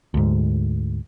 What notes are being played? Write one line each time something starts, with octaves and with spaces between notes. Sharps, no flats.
D2 G#2